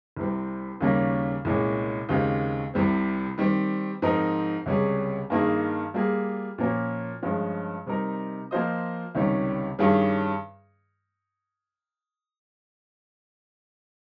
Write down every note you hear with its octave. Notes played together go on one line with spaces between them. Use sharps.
C2 C3 G3 C4
D#2 C#3 G3 A#3 C#4
C2 A#2 G#3 C#4
D#2 C#3 G#3 C4 G4
C2 C3 G3 C4
D#3 G3 C4
G#2 F3 C4 D#4 A#4
C#2 C3 G3 C#4 G#4
G2 D#3 A#3 D#4 G#4
G3 A#3 F4 G#4
A#2 F3 A#3 C#4 F4
G2 F3 G#3 C#4
C3 G3 C4 D#4 A#4
F3 A#3 F4 C5 D#5
C#2 C3 D#3 G3 C#4
G2 D#3 G3 C#4 G#4